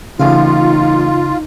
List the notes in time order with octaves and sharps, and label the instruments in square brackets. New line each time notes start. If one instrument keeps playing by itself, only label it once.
[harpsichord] A1 F5 [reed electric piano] C#3 [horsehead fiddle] D#4 [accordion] F4